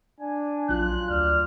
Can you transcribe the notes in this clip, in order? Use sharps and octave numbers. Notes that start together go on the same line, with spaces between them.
D4 G#5
A#1 F#3 F4 F#6
D2 D5 F6